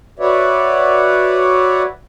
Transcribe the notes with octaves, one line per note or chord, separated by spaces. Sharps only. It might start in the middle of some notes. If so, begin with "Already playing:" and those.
F#4 B4 C#5 D5 E5 F#5